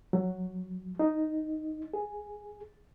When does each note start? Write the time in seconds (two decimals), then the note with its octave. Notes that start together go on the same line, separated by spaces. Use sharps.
0.13 F#3
0.99 D#4
1.94 G#4